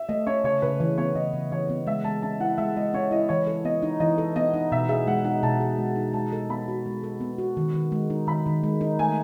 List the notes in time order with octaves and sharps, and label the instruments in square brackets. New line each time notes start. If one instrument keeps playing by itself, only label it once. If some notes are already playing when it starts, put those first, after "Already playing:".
Already playing: [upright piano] E5
[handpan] A3 [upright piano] D#5
[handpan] C#4 [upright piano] C#5
[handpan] C#3 [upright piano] C#5
[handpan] C#3 [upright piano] B4
[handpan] E3 [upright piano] C#5
[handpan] B3 [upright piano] C#5
[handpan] C#3 [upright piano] D#5
[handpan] C#3
[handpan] E3 [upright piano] C#5
[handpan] B3
[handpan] G#3 [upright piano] E5
[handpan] G#3 [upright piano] A5
[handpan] C#4 [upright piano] A5
[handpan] E4 [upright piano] F#5
[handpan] G#3 [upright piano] E5
[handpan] G#3 [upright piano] D#5
[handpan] C#4 [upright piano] C#5
[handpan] E4 [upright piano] D#5
[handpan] E3 [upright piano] C#5
[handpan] A4
[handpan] B3 [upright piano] D#5
[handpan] D#4
[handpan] E3 [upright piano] D#5
[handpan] A4
[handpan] B3 [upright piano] D#5
[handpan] D#4
[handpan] B2 [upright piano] E5
[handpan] G#4 [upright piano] E5
[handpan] G#3 [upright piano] F#5
[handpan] D#4 [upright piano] F#5
[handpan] B2 [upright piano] A5
[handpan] G#4
G#3
D#4
[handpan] G#3 [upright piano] A5
[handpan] A4
[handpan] B3 [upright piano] B5
[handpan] F#4
G#3
A4
B3
F#4
D#3
D#3
G#3
D#4
[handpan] D#3 [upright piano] B5
[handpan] D#3
G#3
D#4
[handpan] A3 [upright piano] G#5